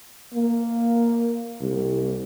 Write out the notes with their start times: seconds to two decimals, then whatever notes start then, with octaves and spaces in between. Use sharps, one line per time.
0.34 A#3
1.61 C2